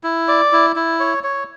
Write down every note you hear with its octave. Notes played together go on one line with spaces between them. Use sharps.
E4
D5
E4
E4
C#5
C#5